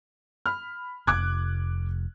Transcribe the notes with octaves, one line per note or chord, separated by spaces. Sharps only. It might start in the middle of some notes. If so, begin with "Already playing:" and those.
B5 F6
F1 D6 F#6 G#6